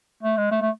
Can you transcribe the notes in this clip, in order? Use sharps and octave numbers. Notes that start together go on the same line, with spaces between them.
A3
G#3
A3
A3